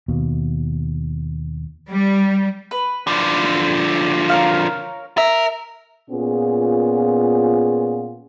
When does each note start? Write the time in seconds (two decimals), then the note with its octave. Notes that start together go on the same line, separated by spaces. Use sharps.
0.08 D#2 B2
1.89 G3
2.71 B4
3.07 D3 F3
4.29 A#4 C#5 F5
5.17 A#4 E5
6.10 A#2 B3 C#4 F4 G#4